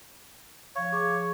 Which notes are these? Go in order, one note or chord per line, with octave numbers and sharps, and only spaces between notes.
F3 C#5 F5
G#4 C#6 D6